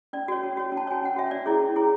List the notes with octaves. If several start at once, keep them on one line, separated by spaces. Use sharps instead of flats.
C#4 D5
F#4 C#5
C#4
F#4 C#5
C#4
A5
F#4 C#5 G#5
C#4 F#5
F#4 C#5 E5
C#4 D5
E4 G#4 C#5
C#4
E4 G#4 C#5